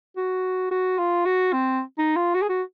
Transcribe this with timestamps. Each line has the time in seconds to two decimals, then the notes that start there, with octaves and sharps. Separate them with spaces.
0.17 F#4
0.71 F#4
0.98 F4
1.26 F#4
1.53 C4
1.98 D#4
2.17 F4
2.35 F#4
2.42 G#4
2.49 F#4